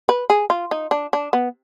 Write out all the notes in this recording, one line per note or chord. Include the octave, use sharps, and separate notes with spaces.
B4
G#4
F4
D#4
D4
D4
B3